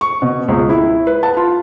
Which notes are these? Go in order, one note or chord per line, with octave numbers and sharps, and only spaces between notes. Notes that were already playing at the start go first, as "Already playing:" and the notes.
C#6
B2
C#2
E4
B4
A5
F4